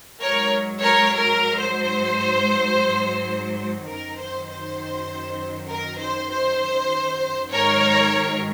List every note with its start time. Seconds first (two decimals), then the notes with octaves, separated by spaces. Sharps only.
0.21 G#2 F#3 A#4 C#5
0.82 A#4 C#5
1.13 A#4
1.58 C5
3.87 F#2 D#3 F#3 A#4
4.17 C5
4.48 C5
5.70 A#4
6.00 C5
6.31 C5
7.52 G#2 D#3 F#3 A#4 C#5